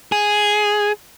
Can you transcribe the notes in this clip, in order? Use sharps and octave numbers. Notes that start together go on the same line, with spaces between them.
G#4